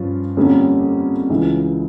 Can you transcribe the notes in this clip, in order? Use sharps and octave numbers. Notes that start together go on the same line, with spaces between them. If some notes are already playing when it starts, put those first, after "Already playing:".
Already playing: G2 F3 C#4 F4
F2 D3 G3 A#3 C#4
C#2 C#3 E3